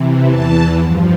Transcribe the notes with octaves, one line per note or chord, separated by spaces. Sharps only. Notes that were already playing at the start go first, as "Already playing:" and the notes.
Already playing: C3 E3
E2 E3 A5
G2 F3